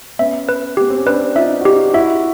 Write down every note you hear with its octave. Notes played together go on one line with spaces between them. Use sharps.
B3 C#4 E5
B4
B3 G4
C4
C#4
C4 D4 B4
D#4 F4 E5
F#4
D#4 F4 G4
E4 F#4 E5